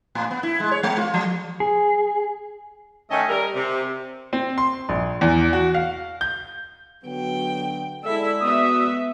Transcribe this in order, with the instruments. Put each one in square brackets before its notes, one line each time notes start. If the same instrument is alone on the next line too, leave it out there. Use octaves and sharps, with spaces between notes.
[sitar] A2
B3
E4
G#3
C#5
G#3
F4
F3
[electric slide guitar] G#4
[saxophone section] D#3 A3 C#4 A4 D#5
G3 A#4
C3
[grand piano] C4
C6
A#1
E2
F#4
F5
G6
[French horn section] D3 F#3 B3 [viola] F#4 G5
[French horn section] G#3 D5 [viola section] E4 A4 [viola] E5
[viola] B3 [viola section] F#4 E5 [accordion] D#6